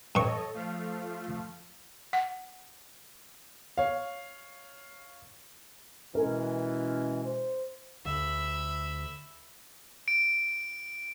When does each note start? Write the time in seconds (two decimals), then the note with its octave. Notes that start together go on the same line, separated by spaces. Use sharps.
0.15 G2 A4 C#5 D#5 C#6
0.54 F3 A3 F5
2.13 F#5
3.78 C#5 F5
6.15 B2 E3 G#3 C#4 A#4
7.25 C5
8.05 D2 E5 F5 B5
10.08 D7